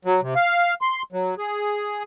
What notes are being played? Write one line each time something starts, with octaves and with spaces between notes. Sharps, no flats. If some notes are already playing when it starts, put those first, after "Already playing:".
F#3
C3
F5
C6
F#3
G#4